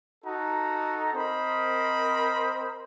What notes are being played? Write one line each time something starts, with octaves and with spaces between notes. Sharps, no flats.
D#4 F#4 A4 A#5
C4 A#4 C5 D#5 B5